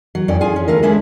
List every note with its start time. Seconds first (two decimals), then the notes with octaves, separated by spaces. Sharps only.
0.15 F#3
0.28 F2 A2 C#4 D5
0.41 F4 G#4 G#5
0.56 C#4
0.68 D2 A3 F4 A#4
0.83 G#3 C#4 D4 E4 G#4